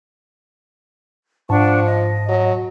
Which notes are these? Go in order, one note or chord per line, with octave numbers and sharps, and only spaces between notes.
G#2 F3 D4 F#5 A5 C#6
D#5
F#3